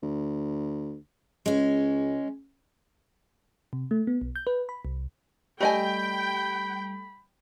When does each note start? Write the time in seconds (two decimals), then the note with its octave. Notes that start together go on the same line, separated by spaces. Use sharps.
0.02 D2
1.46 C#2 G#3 C#4
3.73 C3
3.91 A3
4.07 B3
4.21 B1
4.36 G6
4.47 B4
4.69 B5
4.85 C2
5.61 G3 A3 D#5 G5 G#5 B5